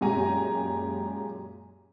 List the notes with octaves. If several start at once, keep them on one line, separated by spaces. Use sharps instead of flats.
F#2 A#2 G#3 G4 G#5 A#5